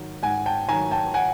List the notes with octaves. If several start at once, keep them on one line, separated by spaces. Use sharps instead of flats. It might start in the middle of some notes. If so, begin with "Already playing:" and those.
Already playing: G#2 D#3 F#3
G#2 F#5 G#5
G5 A5
D#3 F#3 G#5 A#5
G5 A5
F#5 G#5